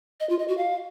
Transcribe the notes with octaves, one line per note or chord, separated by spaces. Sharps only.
D#5
F4
D#5
F#4
F5